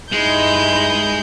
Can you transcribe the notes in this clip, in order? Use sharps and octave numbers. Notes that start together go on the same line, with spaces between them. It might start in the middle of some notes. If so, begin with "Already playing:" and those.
G2 G#3 D#4 E4 G6